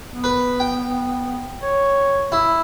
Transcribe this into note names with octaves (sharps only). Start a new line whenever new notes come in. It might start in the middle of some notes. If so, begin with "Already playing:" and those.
B3
B4
G5
C#5
E4